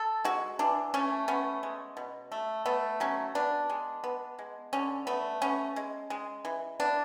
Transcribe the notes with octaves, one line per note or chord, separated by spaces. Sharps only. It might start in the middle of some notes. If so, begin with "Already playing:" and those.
Already playing: A4
G#3 F#4
E3 D4
A3 C#4
B3 C#4
G#3
B2
A3
A3 B3
F#3 C#4
B3 D4
G#3
B3
G#3
D3 C#4
A3 B3
B3 C#4
G#3
G#3
E3
B3 D4